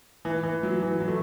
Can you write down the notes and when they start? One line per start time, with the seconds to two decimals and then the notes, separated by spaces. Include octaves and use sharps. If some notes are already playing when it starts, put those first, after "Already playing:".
0.25 E3
0.43 E3
0.63 F#3
0.82 E3
1.00 F#3
1.08 A3